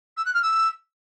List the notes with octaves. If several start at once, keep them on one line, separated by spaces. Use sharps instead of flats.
E6
F#6
F6
E6